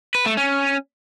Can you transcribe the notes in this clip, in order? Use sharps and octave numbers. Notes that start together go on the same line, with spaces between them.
B4
A3
C#4